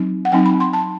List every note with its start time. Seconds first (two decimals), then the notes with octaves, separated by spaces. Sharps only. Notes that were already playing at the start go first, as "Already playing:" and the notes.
Already playing: F#3 C4 D#4
0.25 F#5
0.32 F#3 C4 D#4 G5
0.46 B5
0.60 C6
0.73 A5